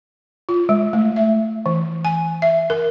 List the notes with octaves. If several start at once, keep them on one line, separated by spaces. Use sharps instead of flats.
F4
G#3
A3
E5
E3
G#5
E5
A#4